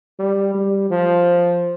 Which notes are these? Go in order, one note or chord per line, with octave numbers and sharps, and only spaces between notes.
G3
G3
F3